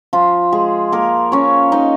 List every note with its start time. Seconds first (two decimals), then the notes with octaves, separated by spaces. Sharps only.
0.13 F3 F4
0.52 G#3 G#4
0.92 A#3 A#4
1.32 C#4 C#5
1.72 D#4 D#5